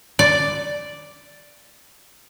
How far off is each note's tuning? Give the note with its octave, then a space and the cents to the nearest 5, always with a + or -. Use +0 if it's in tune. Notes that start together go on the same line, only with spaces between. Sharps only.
D5 +0